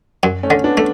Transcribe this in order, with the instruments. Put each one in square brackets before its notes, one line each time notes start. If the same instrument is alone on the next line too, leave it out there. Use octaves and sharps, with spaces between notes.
[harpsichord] F#2
[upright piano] A3 C#4
[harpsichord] D3
[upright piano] B3 D4
[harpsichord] A3